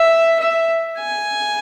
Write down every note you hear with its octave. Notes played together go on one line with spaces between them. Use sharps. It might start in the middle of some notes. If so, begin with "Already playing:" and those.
Already playing: E5
E5
G#5